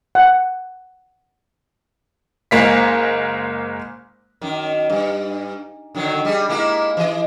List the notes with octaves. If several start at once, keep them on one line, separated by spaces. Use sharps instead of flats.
F#5
F#1 G#3 A#3 B6
F#2 D#3
G2
D3 D#3 F#3
G3 G#4
G#3 A#3 E4
E3 D#5